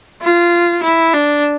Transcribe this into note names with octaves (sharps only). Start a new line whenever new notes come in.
F4
E4
D4